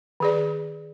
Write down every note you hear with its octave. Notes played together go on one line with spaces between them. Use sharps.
D#3 G#4 D5